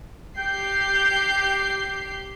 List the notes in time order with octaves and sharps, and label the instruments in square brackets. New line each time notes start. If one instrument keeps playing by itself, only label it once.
[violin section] G4 G6 C7 [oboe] G5